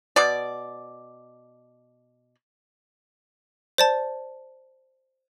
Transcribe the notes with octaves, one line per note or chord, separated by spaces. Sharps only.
B2 D5
C5 D5 A5